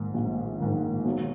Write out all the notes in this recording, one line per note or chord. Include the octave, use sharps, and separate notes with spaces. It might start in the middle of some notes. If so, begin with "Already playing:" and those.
Already playing: A#1 G#2 D#3
A#1
G#2 D#3
B1